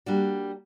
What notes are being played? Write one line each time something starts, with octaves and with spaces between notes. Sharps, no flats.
G3 A#3 D4 F#4